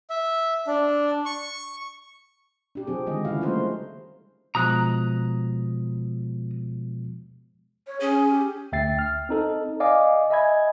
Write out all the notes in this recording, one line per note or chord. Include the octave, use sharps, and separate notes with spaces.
E5
D4
C#6
D4 G4
F3 C4 G#4
D3 D#3 G#3 D#5
C#3 F3 E4 F#4 F5
G3 A3 A#3 F4 A#4 C5
B2 F3 G#3 A#5 D#6 F#6
C#5
C#4 G#4
G4
D2 E5 G5 A6 C7
F6
C4 D#4 A4
D5 D#5 F5 G#5 D6
D#5 E5 G#5 B5 G#6